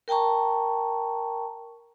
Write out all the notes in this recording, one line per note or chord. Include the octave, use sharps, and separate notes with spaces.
A#4 G5 A5 A#5 C#6